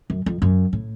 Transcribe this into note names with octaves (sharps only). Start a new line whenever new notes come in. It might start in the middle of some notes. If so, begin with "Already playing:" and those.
F#2
F2
F#2
A2